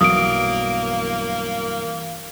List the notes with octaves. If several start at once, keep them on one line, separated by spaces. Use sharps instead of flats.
B1 G2 E3 F#3 A#3 D#6 D7